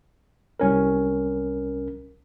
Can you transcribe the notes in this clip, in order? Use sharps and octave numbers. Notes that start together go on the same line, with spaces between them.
C2 C#4 A#4